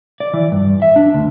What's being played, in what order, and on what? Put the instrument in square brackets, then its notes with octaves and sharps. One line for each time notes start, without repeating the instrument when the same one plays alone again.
[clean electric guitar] D5
E3
G2
E5
D4
D2